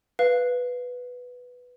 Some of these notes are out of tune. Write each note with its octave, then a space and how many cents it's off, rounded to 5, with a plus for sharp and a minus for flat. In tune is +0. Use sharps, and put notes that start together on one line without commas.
B4 +0 F5 +0